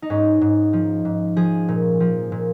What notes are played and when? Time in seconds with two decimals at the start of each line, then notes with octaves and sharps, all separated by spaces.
0.02 D#4
0.10 G#2 C#4
0.41 G#2
0.73 F3
1.05 G#2
1.36 F3 G#4
1.68 A#2
2.00 F3
2.32 A#2